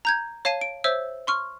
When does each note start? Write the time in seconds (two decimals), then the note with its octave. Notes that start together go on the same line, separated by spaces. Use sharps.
0.05 A#5 G6 G#6
0.45 C#5 F5 A5 C7 D#7
0.61 D7
0.84 C5 C#5 E5 E6
1.27 C6 C#6 F6